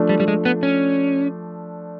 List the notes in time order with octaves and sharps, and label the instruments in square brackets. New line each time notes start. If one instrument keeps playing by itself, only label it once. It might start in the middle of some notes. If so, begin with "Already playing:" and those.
Already playing: [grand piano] F3 A3 D4
[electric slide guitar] G3
G3
G#3
B3
C#4